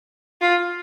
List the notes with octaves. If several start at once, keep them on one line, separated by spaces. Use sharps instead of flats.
F4